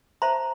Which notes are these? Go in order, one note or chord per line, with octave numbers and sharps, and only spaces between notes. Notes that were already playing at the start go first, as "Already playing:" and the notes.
C5 E5 A5 A#5 C6